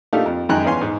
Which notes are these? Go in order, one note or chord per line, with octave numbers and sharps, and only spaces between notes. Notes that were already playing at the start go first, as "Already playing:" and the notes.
A3 A#3 D4 D#4 F4 G4
F2
F#2 D#3 G#3 G5 G#5 F#6
E2 B3 C#4 F5 G#5 C6
G#2